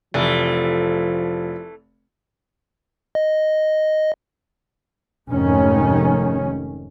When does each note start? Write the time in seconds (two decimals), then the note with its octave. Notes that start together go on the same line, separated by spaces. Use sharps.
0.14 F1 E3 F3 A3
3.15 D#5
5.29 F1 G#2 D#3 C#4